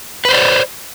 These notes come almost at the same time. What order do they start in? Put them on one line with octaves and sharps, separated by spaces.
B4 C5 D5